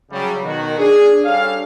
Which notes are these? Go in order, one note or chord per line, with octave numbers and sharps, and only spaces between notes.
C#3 F#3 G3
B2 D#3 F#4
D4 G#4
G3 C#4 D4 A4 F5